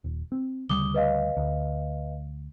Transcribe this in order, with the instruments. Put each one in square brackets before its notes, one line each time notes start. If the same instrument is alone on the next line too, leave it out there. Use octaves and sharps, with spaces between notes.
[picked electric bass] D#1
C4
[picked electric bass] D2 C#3 G3 [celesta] D6 D#6 G7
[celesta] B4 D#5 F5
[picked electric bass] D2